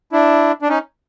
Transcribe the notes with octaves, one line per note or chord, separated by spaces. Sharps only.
D4 E4
D4
C#4 D#4